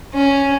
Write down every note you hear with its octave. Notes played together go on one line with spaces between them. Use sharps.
C#4